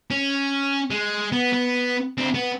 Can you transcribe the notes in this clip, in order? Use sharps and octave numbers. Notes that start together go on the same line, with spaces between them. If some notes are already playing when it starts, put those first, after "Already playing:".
C#4
G#3
B3
B3
D2 C4
B3